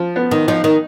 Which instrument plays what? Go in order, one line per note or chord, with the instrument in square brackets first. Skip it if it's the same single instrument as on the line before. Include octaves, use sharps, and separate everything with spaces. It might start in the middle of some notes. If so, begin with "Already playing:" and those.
Already playing: [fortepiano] F3
B3
[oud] D#3
[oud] F3 [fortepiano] D#4
[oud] D#3